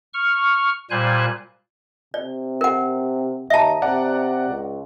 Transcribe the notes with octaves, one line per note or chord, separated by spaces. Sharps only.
C#6 F6
A#2 G3 C5 G#5 F#6
C3 D5
A#4 F#5
D#2 D#5 E5 A5 A#5
C3 D5 F#5 A#5
C#2